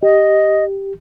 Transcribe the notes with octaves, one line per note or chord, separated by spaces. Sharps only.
G4 D#5